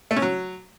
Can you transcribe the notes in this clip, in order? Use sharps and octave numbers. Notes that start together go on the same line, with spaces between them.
A3
C#4
F#3